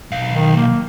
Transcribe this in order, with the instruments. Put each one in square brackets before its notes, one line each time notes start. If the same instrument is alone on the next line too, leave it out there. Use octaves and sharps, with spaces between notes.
[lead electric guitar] B1 F5
[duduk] D#3
A#3